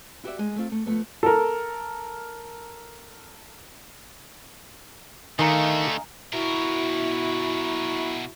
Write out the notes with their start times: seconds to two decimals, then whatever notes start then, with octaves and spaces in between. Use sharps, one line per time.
0.24 E4 F#4 G4 C#5 D5 E5
0.39 G#3 G#5
0.56 A3 C4 F4
0.72 A3
0.86 F3 A3 B3
1.23 A4 A#4
5.39 D3 D#3 A3 D#5 F5 G#5 A#5
6.33 B2 E4 F#4 A#4